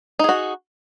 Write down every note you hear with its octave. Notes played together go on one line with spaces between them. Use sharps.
D#4 F#4 G#4